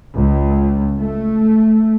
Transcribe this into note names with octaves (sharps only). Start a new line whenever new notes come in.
C#2
A3